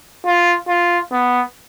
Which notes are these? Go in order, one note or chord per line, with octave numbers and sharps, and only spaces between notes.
F4
F4
B3